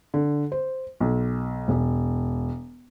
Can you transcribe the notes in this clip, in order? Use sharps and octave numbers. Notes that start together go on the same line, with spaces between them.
D3
C5
B1
E1